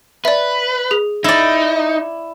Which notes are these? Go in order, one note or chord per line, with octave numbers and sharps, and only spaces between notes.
B4 D5 E5
G#4
D#4 E4 D5